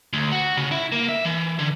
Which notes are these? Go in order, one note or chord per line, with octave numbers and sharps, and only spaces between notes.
D2
F#4
C#3
E4
A#3
E5
E3
D3